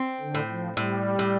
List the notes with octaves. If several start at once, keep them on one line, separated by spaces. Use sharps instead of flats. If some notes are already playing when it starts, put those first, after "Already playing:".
Already playing: C4
D3
A2
F3
A2 G3
A2